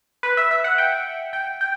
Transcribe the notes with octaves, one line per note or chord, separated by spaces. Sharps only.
B4
E5
E5
F#5
G5
G5
G5